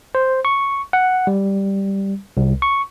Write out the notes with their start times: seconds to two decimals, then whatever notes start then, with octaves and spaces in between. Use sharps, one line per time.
0.15 C5
0.45 C#6
0.93 F#5
1.27 G3
2.37 C2
2.62 C#6